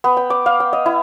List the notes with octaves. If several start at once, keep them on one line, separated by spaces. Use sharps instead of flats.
B3
G5
D6
F5
G5
D#5
E4